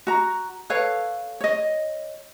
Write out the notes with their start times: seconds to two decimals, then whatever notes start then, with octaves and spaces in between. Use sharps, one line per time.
0.07 F#4 A#5
0.70 A4 B4 C#5 F5
1.41 C#5 D#5